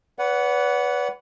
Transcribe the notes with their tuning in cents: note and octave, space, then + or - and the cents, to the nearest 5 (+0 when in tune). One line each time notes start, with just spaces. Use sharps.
B4 +0 D5 -45 F#5 +0